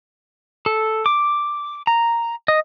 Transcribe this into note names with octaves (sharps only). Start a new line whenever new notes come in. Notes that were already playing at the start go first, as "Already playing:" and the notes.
A4
D6
A#5
D#5